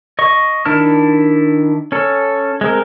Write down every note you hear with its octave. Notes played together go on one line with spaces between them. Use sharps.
D#5 C#6
D#3 D4 E4 A5 F6
C#4 A4
G#3 C4 A#4